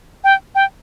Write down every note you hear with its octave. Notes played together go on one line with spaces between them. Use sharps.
G5
G5